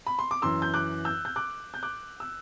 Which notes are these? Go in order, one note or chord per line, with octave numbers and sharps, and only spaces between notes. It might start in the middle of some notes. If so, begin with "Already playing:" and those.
B5
C6
D6
F#2 E3 C6 E6
G6
D6 F#6
E6 G6
G6
D6 F#6
G6
D6 F#6
E6